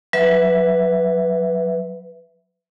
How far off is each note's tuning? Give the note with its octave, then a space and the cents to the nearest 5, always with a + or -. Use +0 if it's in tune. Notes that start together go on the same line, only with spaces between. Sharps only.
F#3 -15 B4 +0 E5 -5